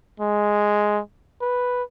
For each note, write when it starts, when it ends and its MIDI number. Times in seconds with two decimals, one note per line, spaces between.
0.20 1.00 56
1.41 1.83 71